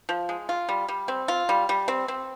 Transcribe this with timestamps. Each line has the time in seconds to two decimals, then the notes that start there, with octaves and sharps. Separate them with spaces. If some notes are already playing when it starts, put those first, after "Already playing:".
0.09 F3
0.29 G#3
0.49 F4
0.69 G3
0.88 G3
1.08 C4
1.28 F4
1.49 G3
1.69 G3
1.88 C4
2.08 C4